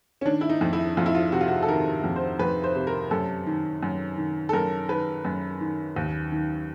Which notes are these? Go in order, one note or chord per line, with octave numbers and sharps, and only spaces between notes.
C#4
D#3 D4
E4
D#4
F2
E4
F2 F4
E4
F4
C3 F#4
F4
F#4
A4
D#3 A#4
F2
C5
F2 B4
C5
C3
A#4
F#2 A4
D#3
F#2
D#3
A4
F#2 A#4
D#3 B4
F#2
D#3
D#2
D#3